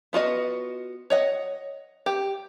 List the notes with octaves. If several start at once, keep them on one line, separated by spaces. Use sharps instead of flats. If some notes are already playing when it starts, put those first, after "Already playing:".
B3 F4 F#4 D#5
C#5 D#5 F#5
G4